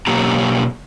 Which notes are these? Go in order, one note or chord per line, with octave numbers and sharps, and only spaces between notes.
B2 F#3 A#3 G4 A#5